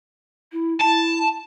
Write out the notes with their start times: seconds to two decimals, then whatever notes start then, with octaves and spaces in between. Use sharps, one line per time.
0.52 E4
0.81 E4 A5